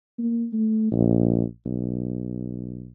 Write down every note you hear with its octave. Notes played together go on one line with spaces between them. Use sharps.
A#3
A3
A#1
B1